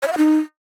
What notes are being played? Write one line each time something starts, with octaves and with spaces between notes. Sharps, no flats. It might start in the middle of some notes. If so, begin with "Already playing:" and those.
C#5
E5
F#5
D#4